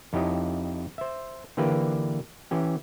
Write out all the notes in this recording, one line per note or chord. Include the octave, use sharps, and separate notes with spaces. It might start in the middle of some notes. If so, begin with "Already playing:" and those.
F2 D#4 E4 G4 C#5 D#5
C5 E5
D3 E3 A#3 G4 B4 D5
E3 C#4 G4